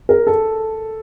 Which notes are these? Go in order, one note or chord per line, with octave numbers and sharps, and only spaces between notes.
A#4
A4